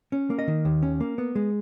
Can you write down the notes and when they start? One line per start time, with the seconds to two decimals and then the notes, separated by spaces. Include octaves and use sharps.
0.12 C#4
0.30 A#3
0.39 D#5
0.48 D#3
0.65 D#2
0.82 C#4
1.00 A#3
1.18 B3
1.35 G#3